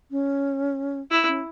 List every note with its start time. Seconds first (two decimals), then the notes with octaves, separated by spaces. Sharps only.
0.11 C#4
1.11 E4
1.27 C#4